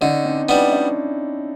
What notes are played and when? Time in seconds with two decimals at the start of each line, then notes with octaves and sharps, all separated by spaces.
0.01 D3 C#4 D#4
0.25 C4 D4
0.49 G3 B3 D4 E4
0.72 C#4 D#4